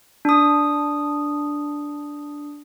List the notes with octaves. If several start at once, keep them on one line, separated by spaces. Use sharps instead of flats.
D4 D#6